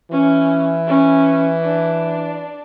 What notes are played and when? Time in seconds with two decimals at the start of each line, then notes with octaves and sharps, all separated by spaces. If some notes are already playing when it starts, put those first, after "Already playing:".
0.11 E3 C#4
0.87 C#4
1.63 D4